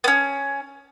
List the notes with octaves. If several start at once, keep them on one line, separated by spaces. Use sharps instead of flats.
B3 C#4